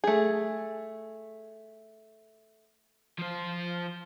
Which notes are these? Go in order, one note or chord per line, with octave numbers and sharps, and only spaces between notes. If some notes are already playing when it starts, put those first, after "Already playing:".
A3 G#4
F3 C5